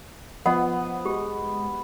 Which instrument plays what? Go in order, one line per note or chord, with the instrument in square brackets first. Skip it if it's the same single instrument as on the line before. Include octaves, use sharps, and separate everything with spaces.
[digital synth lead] F3 [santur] B3 [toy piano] D#5 F#5
[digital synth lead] G#3 [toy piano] F4 G4